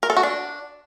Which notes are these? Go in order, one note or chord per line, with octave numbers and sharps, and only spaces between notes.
A#4
A4
F#4
D4